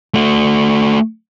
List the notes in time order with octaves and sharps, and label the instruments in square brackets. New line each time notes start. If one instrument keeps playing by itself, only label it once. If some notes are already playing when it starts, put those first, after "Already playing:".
[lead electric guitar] A3 F#4